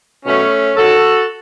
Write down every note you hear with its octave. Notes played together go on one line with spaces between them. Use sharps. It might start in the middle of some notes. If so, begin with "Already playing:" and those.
B2 F#3 A3 C#4
F#2 D#3 F#3 F#4 A4